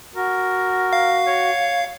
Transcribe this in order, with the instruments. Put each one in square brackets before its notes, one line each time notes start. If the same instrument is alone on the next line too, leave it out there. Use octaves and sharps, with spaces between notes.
[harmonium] F#4 [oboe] A#4
[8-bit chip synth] F5
[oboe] C#5